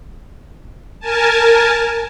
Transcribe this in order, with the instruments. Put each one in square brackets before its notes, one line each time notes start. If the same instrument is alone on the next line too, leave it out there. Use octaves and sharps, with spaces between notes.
[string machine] A#4 G#5 A5